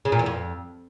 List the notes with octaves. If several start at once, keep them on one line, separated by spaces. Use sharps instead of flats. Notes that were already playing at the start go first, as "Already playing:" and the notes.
C#3
A#2
E2
F2